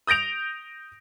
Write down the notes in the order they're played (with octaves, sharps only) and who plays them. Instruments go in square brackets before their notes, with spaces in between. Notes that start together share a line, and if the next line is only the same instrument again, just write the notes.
[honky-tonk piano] D#6 G6 A#6 D7 F7